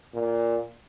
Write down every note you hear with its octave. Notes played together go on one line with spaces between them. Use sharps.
A#2